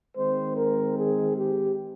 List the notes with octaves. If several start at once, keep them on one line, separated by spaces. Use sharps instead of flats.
D#3 G#3 C4 C5
A#4
G#4
G4